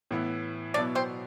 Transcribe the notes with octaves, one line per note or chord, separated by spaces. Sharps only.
A2 E3 B3 E4
B2 F#3 B3 D4 E4 D5
C4 C5